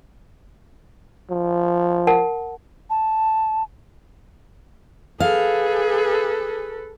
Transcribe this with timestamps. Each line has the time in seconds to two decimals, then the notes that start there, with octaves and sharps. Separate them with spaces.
1.31 F3
2.07 A#4 F#5 A5
2.90 A5
5.20 G#4 A4 B4 F5